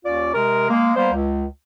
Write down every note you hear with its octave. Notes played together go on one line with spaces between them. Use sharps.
D#2 C#4 F4 D5
C3 G#3 A#4
G#3 A#3
G3 A#3 B3 C5
C#2